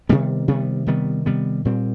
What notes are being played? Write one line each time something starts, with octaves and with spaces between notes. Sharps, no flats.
C3 D#3 G3 B3
C3 D#3 G3 B3
C3 D#3 G3 B3
C3 D#3 G3 B3
A#2 G3 C4